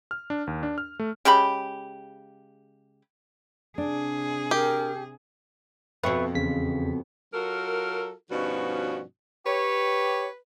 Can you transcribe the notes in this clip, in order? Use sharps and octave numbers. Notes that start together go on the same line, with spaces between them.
F6
D4
D#2
D4
F6
A3
C#3 G#3 G4 B5
C3 D4 G#4
G4 A#4
F2 B2 B4 E5 C#6
E2 C#3 B6
F#3 F4 F#4 A4 A#4
G2 B2 F3 C#4 D#4 F#4
G4 B4 C#5